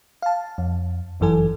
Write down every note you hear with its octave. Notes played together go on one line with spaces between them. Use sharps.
F5 A5
F2
G1 F#2 E3 A4 G#5